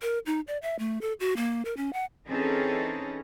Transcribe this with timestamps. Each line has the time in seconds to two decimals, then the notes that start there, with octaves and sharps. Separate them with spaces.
0.02 A#4
0.26 D#4
0.47 D5
0.62 E5
0.79 A3
1.01 A4
1.20 F#4
1.37 A#3
1.65 A#4
1.77 C#4
1.93 F#5
2.26 E3 C4 C#4 D#4 G#4 A4